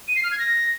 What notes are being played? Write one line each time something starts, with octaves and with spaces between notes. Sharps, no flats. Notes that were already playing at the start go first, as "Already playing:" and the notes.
D#7
C7
F6
G#6
A#6